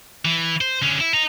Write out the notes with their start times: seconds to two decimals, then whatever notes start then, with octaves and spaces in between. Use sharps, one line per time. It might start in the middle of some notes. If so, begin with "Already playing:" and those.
0.25 E3
0.61 C5
0.83 D3 C#4
1.00 E4
1.14 D#5 A#5